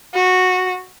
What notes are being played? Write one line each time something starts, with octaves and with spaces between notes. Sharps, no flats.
F#4